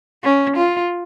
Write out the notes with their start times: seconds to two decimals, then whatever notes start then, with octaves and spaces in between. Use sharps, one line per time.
0.24 C#4
0.57 F4